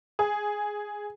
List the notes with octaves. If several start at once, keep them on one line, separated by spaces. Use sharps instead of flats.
G#4